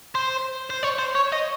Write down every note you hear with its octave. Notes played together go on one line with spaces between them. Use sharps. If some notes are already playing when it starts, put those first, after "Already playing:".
C5
C5
C#5
C5
C#5
D#5